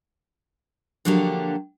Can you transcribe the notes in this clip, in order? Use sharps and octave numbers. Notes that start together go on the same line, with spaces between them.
D3 F3 F#3 A#3 D4 G4